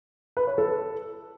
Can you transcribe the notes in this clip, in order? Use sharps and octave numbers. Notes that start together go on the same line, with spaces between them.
B4
C#5
A4